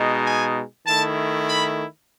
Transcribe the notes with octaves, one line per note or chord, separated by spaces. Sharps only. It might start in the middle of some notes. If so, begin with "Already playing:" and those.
Already playing: B2 G#3 D#4
G#5
D#3 A3 E4 A5
B5